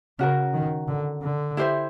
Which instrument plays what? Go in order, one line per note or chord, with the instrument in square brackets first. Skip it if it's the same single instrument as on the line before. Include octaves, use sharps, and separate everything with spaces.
[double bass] C#3 [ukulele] C#4 F#4 A#4
[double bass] D#3
D3
D3
[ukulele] E4 G4 C5 E5